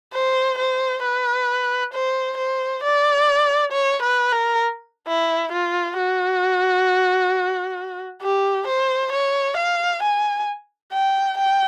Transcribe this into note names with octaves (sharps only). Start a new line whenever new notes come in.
C5
C5
B4
C5
C5
D5
C#5
B4
A#4
E4
F4
F#4
G4
C5
C#5
F5
G#5
G5
G5